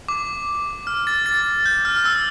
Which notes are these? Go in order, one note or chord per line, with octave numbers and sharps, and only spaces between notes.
D6
F6
A6
A6
G6
F6
F6
E6